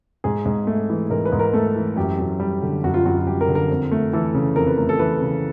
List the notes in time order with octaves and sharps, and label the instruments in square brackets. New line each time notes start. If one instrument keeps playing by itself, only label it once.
[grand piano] G#2 G#4
G#2
A3
E3
G#2 A#4
B4
G#2
A#4
A3 A4
E3
F#2 G4
F#2
G3
D3
F#2 F#4
F4
F#2 F#4
G3 G4
A#4
D3
A#4
F2
A3
E3 A4
C#3
F2 A#4
B4
A3 A#4
A4
E3 B4
C#3